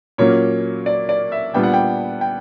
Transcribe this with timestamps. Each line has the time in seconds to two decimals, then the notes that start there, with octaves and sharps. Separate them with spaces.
0.18 A#2 F#3 A#3 C#4 C#5
0.86 D5
1.09 D5
1.32 E5
1.54 A#2 G3 B3 D4 G5
1.63 F#5
1.74 G5
2.21 G5